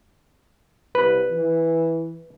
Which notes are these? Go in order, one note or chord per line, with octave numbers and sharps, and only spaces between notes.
C2 B4
E3